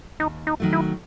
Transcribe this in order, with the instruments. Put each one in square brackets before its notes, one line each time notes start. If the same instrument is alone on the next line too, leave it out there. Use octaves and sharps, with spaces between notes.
[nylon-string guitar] D#2 [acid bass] D#4
[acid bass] D#4
[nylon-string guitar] D#3 F#3 A3
[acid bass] E4